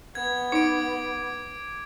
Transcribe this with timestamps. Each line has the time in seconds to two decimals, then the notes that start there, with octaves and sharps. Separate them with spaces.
0.15 B3 G#6
0.52 D#4 D6 D7